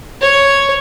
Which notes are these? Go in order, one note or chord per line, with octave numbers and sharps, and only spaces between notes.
C#5